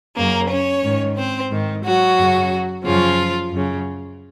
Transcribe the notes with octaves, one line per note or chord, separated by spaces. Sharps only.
F#2 C#3 A#3 A#4
C#4 C#5
G#2 D#3
C4 C5
G#2 D#3
F#3 F#4
F#2 C#3
F#2 C#3 F3 F4
F#2 C#3